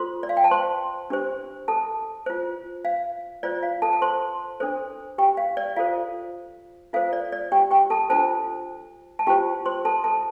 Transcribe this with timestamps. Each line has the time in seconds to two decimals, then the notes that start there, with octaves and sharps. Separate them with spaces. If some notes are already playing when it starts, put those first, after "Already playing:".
Already playing: F4 A4 C5 C6
0.23 D5
0.29 F5
0.37 G5
0.44 A5
0.51 C5 C6
1.10 D4 G4 C5
1.68 A4 A5
2.26 F4 C5
2.85 F5
3.43 F4 C5 D5
3.63 F5
3.82 A4 A5
3.93 A5
4.02 C5 C6
4.60 D4 A4 C5
5.18 G4 G5
5.37 F5
5.57 D5
5.76 F4 A4 C5 F5
6.93 F4 A4 C5 F5
7.13 D5
7.32 D5
7.52 G4 G5
7.71 G4 G5
7.90 A4 A5
8.10 D4 F4 A4 C5 A5
9.19 A5
9.27 F4 G4 C5 G5
9.66 C5 C6
9.85 A4 A5
10.04 A4 A5